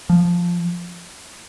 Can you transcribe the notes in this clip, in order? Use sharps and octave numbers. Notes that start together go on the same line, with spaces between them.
F3